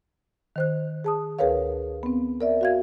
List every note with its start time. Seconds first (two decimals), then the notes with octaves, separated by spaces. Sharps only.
0.56 D#3 C5 F#6
1.04 G#4 A5 D#6
1.39 D2 G#4 A#4 B4 C#5 F5
2.03 B3 C4
2.41 A#4 D5 E5
2.61 F#4 F5 G#6